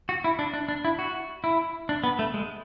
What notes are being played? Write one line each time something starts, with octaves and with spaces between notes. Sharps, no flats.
F#4
E4
D4
D4
D4
E4
F#4
E4
D4
B3
A3
G#3